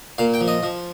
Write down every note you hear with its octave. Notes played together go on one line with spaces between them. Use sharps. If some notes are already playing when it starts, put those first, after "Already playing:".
A#2 F5
G5
F3
D#5
F3